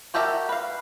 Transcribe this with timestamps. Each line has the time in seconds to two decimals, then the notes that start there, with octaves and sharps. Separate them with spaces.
0.14 F#4 G4 A4 A#4 E5
0.49 B4 F5